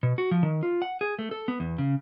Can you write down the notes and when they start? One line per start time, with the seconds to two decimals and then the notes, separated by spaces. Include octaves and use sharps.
0.03 B2
0.18 F#4
0.31 F3
0.43 D#3
0.63 F4
0.82 F#5
1.01 G#4
1.19 A3
1.31 A4
1.48 B3
1.60 E2
1.78 C#3